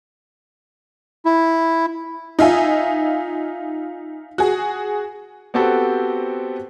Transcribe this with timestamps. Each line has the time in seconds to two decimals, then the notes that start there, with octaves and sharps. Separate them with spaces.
1.25 E4
2.39 D#4 F4 E5 G#5
4.38 F#4 G#4
5.54 B3 C4 F#4 G4 A4 C5